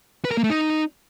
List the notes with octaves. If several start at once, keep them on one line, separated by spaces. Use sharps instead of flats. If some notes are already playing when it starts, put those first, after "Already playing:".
B4
A#4
A#3
A3
D#4